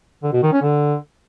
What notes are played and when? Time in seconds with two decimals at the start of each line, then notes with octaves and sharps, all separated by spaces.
0.23 D3
0.33 B2
0.43 D#3
0.53 C#4
0.62 D3